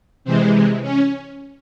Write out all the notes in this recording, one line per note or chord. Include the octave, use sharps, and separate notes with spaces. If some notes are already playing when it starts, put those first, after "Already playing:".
C3 E3 G#3 C4
C#4